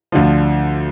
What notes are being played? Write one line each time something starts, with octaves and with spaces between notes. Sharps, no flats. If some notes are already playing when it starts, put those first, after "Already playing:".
D2 D3 F3